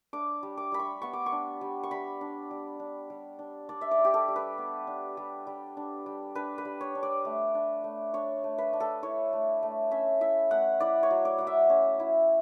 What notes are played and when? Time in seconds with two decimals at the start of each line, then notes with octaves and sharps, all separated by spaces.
0.13 D4 D6
0.43 G3
0.57 D6
0.72 G3 B5
0.79 C#6
1.02 B3 C#6
1.13 D6
1.26 C#6
1.32 D4
1.61 G3
1.83 C#6
1.91 G3 B5
2.21 D4
2.51 G3
2.80 D4
3.10 G3
3.39 D4
3.69 D4 D5
3.81 E5
3.91 D5
3.99 G3
4.05 G4
4.14 A4
4.28 G3
4.36 B4
4.58 B3
4.87 D4
5.17 G3
5.47 G3
5.77 D4
6.06 G3
6.35 D4 B4
6.58 B4
6.65 G3
6.81 C#5
6.95 D4
7.03 D5
7.25 A3
7.55 D4
7.84 A3
8.14 D4 C#5
8.44 A3
8.58 B4
8.73 D4
8.80 A4
9.03 E4 C#5
9.33 A3
9.63 A3
9.91 C#4 E5
10.21 E4 E5
10.51 A3 F#5
10.80 E4 D5
11.03 C#5
11.11 F#3
11.25 D5
11.38 F#3 F#5
11.47 E5
11.70 C#4
12.00 E4